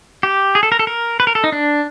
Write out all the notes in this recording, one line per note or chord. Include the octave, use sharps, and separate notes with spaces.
G4
G#4
A4
A#4
A4
A#4
B4
A#4
A4
D#4
D4